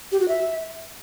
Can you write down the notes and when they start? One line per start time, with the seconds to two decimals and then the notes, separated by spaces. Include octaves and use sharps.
0.12 G4
0.20 F#4
0.28 E5